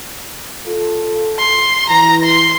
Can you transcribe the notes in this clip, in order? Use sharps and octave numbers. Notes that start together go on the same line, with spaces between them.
F4 A4
C6
E3 A#5
C6